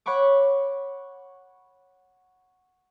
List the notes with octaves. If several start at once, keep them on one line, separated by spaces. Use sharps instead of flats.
C#5 F#5 B5 C#6 D6